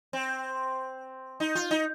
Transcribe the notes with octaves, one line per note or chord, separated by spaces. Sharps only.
C4
D#4
F4
D#4